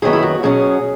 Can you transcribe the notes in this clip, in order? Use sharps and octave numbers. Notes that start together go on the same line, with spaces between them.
F#2 D#3 F#3 B3 G#4
E4
F#4
B2 F#3 C#4 G#4